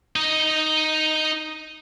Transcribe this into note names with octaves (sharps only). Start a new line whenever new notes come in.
D#4 D#5